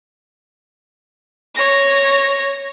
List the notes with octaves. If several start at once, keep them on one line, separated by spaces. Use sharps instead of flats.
C#5 A#6